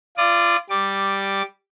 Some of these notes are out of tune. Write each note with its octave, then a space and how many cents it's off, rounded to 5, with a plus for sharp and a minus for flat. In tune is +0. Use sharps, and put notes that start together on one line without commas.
F4 -25 D5 +0 D#6 -30
G3 +0 D6 +0